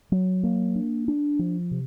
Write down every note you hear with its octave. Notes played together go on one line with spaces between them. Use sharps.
F#3
A#3
D4
D4
F3
C3